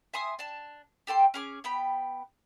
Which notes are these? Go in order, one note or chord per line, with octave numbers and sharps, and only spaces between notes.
E5 G#5 C6 D#6
D4 A5
G4 A4 G5 C6
C#4 G#4 D6
B3 G5 B5